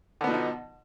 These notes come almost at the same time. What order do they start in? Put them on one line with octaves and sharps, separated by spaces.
D3 B3 B2 F3 D#4